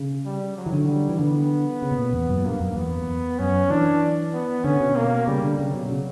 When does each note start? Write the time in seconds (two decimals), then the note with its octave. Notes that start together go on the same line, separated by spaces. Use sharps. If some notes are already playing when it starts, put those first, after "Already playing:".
Already playing: C#3
0.25 G3
0.57 F#3
0.66 E3
0.73 D3
0.88 G3
1.09 E3
1.19 D3 B3
1.82 C#3
1.92 B2
1.98 A#2
2.13 E2
2.29 F#2
2.37 A#2
2.45 G2 A#3
2.60 F#2
2.72 F#2
2.76 E2 B3
3.39 F#2 C#4
3.70 E3 D4
4.33 B3
4.64 D3 C#4
4.80 B2
4.96 A#3
5.27 C#3 G3
5.43 D3
5.59 C#3 F#3
5.74 B2
5.90 C#3